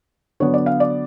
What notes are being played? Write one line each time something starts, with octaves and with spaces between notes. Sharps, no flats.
D3 F#3 B3 C#5
D5
F5
D5